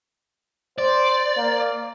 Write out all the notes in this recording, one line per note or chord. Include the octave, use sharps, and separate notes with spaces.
C5 D5
A#3